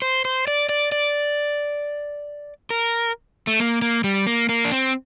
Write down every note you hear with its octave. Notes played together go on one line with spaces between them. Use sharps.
C5
C5
D5
D5
D5
A#4
A3
A#3
A#3
G3
A#3
A#3
D4
C4